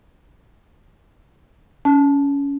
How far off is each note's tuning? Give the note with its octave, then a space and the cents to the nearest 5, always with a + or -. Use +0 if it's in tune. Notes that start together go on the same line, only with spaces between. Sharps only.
C#4 +20 A5 -10